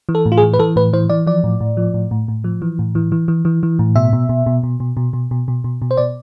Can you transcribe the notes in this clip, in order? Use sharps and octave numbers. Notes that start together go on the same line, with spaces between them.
E3
A4
A2
F4
G#4
E3
B4
E3 A4
A2 B4
E3 C5
E3 D5
F3 D5
A2
A2
F3
A2
A2
A2
F3
E3
A2
E3
E3
E3
E3
E3
A2
B2 E5
B2
B2
B2
B2
B2
B2
B2
B2
B2
B2
B2
C5
B2 D5